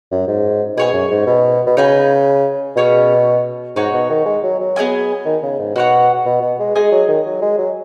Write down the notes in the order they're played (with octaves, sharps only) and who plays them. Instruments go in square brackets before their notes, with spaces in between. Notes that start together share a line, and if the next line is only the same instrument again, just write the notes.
[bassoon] F#2
G#2
[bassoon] B2 [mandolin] G#4 C#5 G#5
[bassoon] F#2
G#2
B2
B2
[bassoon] C#3 [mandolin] D#4 B4 G#5
[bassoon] B2 [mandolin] C#4 G#4 C#5
[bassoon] G#2 [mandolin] D#4 F#4 C#5 G#5
[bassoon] B2
D#3
G#3
F#3
F#3
[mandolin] B3 G#4 D#5 G#5
[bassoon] D#3
C#3
G#2
[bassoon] B2 [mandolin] F#4 C#5 F#5
[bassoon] B2
B2
G#3
[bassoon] G#3 [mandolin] D#4 G#4 D#5 G#5
[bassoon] F#3
D#3
F#3
G#3
F#3